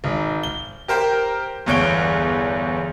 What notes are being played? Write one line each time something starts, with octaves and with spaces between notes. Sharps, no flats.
G#1 D#4
G7
G4 A#4 C5 G5
G1 E2 C#5 D7 G7